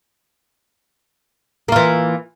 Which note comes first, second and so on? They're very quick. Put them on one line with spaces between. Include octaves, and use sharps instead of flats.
A#3 F4 E3